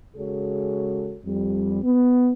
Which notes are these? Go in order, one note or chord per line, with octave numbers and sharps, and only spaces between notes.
C#3 G#3 F#4 G#4 A4 C#5
F2 G3
B3